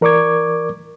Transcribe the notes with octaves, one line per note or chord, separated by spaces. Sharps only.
E3 A#4 D5 C#6 D6 G#6